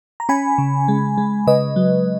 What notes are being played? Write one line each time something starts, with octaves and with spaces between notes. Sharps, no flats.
A#5
C#4 G#5 B5
C#3
G#3
G#3
C#3 B4 D#5
F#3